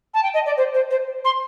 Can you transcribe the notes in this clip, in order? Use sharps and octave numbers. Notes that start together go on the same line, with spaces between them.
A5
G5
D#5
D5
C5
C5
C5
C6